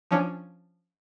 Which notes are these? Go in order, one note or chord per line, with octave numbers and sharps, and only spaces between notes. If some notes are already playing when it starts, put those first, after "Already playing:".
F3 C#4 D4